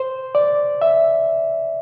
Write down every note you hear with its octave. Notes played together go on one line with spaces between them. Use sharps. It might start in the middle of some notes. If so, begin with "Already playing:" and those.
Already playing: C5
D5
E5